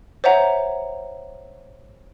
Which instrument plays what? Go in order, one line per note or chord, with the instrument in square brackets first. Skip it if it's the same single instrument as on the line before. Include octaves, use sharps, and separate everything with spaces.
[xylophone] C5 C#5 E5 F#5 A#5